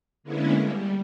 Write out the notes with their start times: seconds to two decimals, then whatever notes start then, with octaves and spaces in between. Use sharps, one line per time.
0.23 D3 G#3 A#3 B3 C#4 E4
0.61 G3